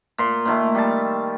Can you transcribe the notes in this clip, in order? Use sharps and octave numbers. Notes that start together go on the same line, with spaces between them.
A#2 C6
A#2 D#3 A3
G3 A5